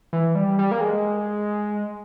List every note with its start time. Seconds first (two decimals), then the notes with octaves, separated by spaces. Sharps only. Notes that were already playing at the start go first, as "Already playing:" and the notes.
0.13 E3
0.35 G3
0.59 G3
0.71 A#3
0.81 G#3